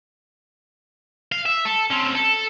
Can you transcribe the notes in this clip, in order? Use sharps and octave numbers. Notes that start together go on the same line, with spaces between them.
F5
E5
A4
C4 C#4
A4